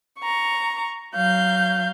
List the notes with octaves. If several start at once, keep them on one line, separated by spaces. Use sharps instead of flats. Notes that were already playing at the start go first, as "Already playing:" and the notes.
A#5 C#6
F#3 F5 G6